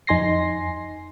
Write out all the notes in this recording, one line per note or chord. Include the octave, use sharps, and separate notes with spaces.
F2 D#4 G#5 C6 A#6 C7